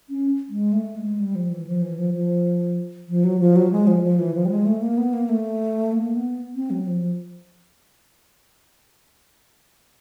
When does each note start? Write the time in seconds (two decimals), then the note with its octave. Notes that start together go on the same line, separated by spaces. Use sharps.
0.10 C#4
0.49 G#3
0.73 A3
0.96 G#3
1.20 G3
1.35 F3
1.51 E3
1.67 F3
1.83 E3
1.99 F3
2.14 F3
3.09 F3
3.24 F#3
3.40 F3
3.56 F#3
3.72 G#3
3.87 F3
4.03 F3
4.19 E3
4.34 F3
4.45 G3
4.51 G#3
4.66 A3
4.82 A#3
4.98 B3
5.13 A#3
5.29 A3
5.92 A#3
6.16 B3
6.55 C4
6.70 F#3
6.87 F3